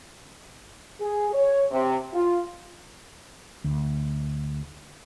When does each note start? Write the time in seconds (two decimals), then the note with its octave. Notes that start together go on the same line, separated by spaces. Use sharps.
1.01 G#4
1.33 C#5
1.71 C3
2.13 F4
3.64 D2